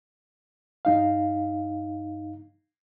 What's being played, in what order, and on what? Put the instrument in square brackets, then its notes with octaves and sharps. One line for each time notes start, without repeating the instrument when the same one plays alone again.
[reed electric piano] G2 D#4 F5